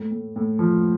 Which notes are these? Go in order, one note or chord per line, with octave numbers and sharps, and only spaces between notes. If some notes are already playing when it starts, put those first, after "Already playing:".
Already playing: A2
A2
A2
F3